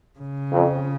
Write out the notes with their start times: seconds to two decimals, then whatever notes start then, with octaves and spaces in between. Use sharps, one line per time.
0.19 C#3
0.52 F2